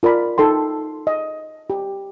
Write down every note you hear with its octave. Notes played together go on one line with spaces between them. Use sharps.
F4 A#4 D5 B5
D#4 A4 G5 C6
D#5
G4